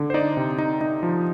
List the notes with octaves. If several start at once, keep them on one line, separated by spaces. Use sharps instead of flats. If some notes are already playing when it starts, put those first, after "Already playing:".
Already playing: D3
C5
D#4 D5
C3
D#4
D#4
F3